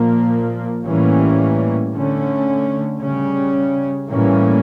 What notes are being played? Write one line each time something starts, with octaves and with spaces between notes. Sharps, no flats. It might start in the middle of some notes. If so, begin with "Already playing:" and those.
Already playing: A#2 F3 A#3
A2 E3 G3 A#3 C#4
D3 A3 C#4
C#3 G3 C#4
A2 E3 G3 A#3 C#4